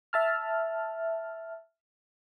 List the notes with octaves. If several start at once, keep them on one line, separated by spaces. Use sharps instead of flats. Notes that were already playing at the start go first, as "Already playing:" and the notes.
E5 A5 F6